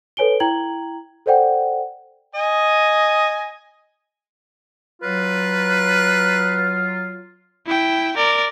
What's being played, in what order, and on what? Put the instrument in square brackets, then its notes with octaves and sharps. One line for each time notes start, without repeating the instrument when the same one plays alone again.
[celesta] A4 B4 C#5 G#5 D7 G7
E4 G5 A#5 G#6 F#7
A4 C5 D5 F#5 G5
[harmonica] D#5 G#5
[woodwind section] F#3 F4 [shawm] B4
[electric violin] E4 G5
A#4 D5